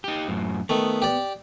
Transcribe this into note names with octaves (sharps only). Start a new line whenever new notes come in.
D#4 G4
F#2 A2
D#3 A3 B3
G4 D5